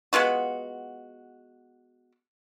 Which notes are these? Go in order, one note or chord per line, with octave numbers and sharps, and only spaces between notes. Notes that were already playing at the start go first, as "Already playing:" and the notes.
G#3 B3 F4 F#4